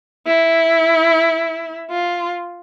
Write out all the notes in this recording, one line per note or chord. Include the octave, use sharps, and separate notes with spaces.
E4
F4